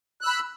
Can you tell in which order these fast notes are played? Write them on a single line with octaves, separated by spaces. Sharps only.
F#6 E6 B5